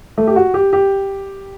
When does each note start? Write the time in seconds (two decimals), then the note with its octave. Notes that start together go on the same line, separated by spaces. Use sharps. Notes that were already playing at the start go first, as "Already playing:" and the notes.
0.18 A3
0.27 G4
0.36 F#4
0.54 G4
0.73 G4